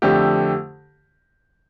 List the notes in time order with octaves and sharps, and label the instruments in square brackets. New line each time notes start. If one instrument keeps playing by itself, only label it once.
[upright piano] F2 D3 A3 G4